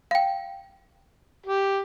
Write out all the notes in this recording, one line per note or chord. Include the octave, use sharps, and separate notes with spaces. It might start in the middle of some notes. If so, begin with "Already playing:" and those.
F5 G5
G4